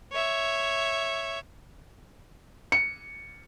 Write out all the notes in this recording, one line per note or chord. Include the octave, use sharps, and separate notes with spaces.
C#5 E5
C#7